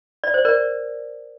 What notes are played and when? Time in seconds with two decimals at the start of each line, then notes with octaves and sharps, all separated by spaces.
0.24 D5
0.34 C5
0.45 A#4 D5